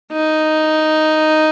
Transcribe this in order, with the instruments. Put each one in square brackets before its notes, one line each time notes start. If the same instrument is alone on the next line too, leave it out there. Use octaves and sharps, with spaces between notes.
[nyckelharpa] D#4